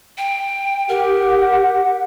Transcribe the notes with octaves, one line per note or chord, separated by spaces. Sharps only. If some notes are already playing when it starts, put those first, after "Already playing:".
G5
G4 A#4 F#5